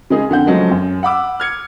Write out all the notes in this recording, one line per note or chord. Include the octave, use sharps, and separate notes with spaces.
C#3 G#3 D#4 G#4
F2 D3 F#5 G6
C#3 F3 F#3 G#3 A3
F#2
F#5 B5 D6 E6
F6 G#6 C#7